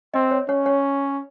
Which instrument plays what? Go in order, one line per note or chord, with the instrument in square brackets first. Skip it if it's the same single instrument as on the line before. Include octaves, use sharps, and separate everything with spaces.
[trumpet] C4 [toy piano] D#5
[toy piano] C#5
[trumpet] C#4 [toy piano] C#5
[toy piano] C#5